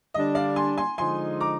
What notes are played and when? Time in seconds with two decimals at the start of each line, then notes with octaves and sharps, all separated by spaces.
0.14 D3 G3 D4 D#5
0.35 D5 F5
0.56 G#5 C6
0.78 G#5 C6
0.98 D3 F3 G#3 D#4 G#5 C6
1.40 A#5 D6